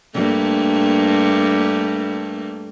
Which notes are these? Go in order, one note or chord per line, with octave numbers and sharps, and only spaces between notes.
G2 A3 A#3